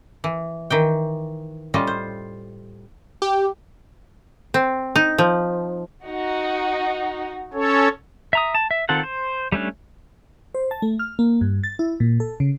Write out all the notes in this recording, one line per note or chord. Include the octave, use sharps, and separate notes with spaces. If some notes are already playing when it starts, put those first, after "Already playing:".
E3
D#3 E3 G5
A2 G3 C#4 F4 D#5
C5
G4
C4
D#4
F3
D#4 F#4
C#4 A4 C#5
E5 A#5 D#6
A5
E5
D#3 C4 F4 A4 F#5
C5
G3 A3 C#4 D4
C5
A5
A3
F6
A#3
G2
A6
E4
A#2
A4
C#3